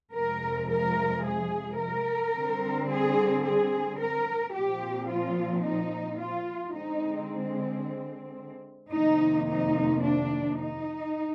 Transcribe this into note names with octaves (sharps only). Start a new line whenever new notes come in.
F2 C3 F3 G#3 A#4
A#4
G#4
A#4
D3 G3 C4
G#4
G#4
A#4
A#2 F3 C4 G4
F4
D#4
F4
D3 G#3 C4 D#4
F2 C3 D#3 A#3 D#4
D#4
D4
D#4